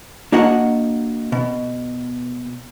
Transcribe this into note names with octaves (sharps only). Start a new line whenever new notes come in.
A#3 D4 F#4 A#4 D#5 F#5
B2